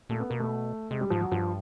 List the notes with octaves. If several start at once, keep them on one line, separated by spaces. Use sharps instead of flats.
A#2 A3
B3
B2 A#3
A3
C3 G#3
G3
G#2 F3
F#3
G2 F3